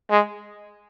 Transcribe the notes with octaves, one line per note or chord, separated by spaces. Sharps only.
G#3